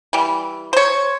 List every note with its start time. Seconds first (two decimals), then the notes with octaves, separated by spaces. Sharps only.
0.13 E3 G3
0.73 C5 C#5